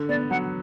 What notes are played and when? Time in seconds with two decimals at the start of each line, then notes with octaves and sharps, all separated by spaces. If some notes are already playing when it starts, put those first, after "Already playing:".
Already playing: D3
0.09 B3 D5
0.30 F#3 F#5